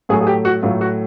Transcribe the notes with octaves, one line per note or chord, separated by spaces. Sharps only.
A2 F#3 A3 G#4
G#4
G4
F#4
A2 F#3 A3 F4
F#4